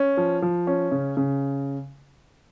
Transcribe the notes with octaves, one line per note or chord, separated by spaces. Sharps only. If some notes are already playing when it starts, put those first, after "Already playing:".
Already playing: C#4
F3
F3
C#4
C#3
C#3